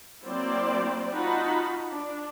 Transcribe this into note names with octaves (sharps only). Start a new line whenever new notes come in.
F#3 A#3 C4 E4 C5 D5
D#4 F4 F#4 F#5 A5 B5
D4